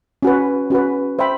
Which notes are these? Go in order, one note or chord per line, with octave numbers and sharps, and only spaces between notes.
C#4 F#4 B4
C#4 F#4 B4
C5 E5 G5 B5